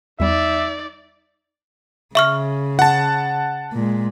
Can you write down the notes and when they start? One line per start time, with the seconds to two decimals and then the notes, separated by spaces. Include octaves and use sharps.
0.20 E2 G3 D#4 D5 E5
2.15 C#3 E5 C#6 F6
2.79 F#5 A5
3.73 A#2 G#3